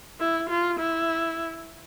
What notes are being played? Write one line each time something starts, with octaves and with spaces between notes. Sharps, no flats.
E4
F4
E4